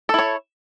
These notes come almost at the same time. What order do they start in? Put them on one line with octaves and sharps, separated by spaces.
A4 E4 C#5